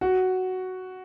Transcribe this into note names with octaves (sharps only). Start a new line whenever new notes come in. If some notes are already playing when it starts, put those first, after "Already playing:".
F#4